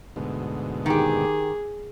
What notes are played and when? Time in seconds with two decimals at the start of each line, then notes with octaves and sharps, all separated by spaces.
0.16 D2 G#2 B2
0.86 D#3 G4 G#4